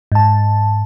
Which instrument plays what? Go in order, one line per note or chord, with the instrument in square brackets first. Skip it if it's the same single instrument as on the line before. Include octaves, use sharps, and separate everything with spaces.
[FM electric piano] G#2 A5